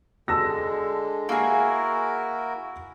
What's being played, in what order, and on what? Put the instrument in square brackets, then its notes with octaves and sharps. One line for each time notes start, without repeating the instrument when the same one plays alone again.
[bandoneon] D3 G#3 [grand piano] A5 E6 A#6
[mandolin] A#3 G#4 [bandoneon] E4 F#4 A#4